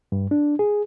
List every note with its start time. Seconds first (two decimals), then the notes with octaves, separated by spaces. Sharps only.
0.12 G2
0.31 D4
0.59 G#4